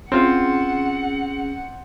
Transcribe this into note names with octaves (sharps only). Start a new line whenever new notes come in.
C4 C#4 F4 G#4 F#5